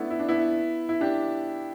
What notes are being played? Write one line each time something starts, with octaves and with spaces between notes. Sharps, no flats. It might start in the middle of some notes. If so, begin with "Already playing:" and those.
Already playing: A3 B3 D4 E4
E4
D4
B3 E4
E4
D4 G4